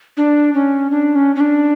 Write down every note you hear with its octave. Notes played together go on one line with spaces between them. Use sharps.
D4
C#4
D4
C#4
C#4
D4